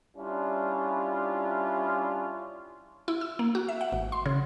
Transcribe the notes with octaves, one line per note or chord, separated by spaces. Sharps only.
G3 C#4 D4 E4 F4
E4
E6
A#3
F#4
E5
F#5
G#1
C6
C#3